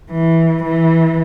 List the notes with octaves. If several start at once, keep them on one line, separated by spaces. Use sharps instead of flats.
E3
E3